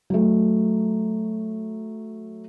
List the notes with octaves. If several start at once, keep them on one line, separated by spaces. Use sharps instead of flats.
F#3 A3